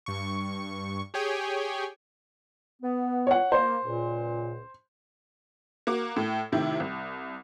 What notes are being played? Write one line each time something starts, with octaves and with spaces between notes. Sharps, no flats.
G2 C#6
G4 G#4 C#5 G5 G#5
B3
C#5 F#5
A#3 C5
C#2 A#2
A#3 F#4 D6
A2
A2 C3 D#3 E4
C2